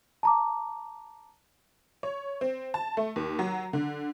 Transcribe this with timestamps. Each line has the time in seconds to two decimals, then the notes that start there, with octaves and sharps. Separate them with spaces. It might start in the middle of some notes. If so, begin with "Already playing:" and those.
0.23 A5 A#5 D6
2.03 C#5
2.41 C4
2.74 A5
2.97 A3
3.16 D#2
3.39 F#3
3.73 D3